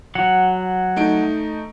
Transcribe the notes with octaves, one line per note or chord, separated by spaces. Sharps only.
F#3 F#5
A3 D#4 D7